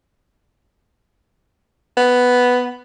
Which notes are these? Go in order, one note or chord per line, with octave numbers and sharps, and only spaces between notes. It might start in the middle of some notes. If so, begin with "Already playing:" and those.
B3